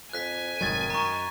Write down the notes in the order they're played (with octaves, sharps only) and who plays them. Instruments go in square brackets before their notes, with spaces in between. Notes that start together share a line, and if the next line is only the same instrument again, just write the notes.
[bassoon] F2 [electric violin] G#5 [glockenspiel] F#6 B6
[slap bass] F1 G#2 F#3 [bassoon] D#3 [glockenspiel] G#6 A6
[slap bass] F#2 [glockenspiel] A#5 C#6